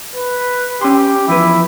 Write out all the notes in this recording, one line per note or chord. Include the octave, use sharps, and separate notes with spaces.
B4
C#4 G4 C6
E2 F3 E4 B4